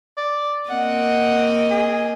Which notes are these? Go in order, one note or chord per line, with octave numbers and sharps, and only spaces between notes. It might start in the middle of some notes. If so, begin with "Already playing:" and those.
D5
A#3 C4 D#5 F#5
G#4